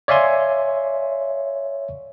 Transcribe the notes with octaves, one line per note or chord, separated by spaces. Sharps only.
C#5 D5 E5 F5 G#5 C6